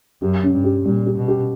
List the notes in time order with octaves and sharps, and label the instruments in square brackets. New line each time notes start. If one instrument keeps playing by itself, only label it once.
[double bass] F#2 [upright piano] G4
[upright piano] C#4
[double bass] G2
[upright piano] G4
[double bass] A#2 [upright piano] G3
[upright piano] G4
[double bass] B2
[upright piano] G4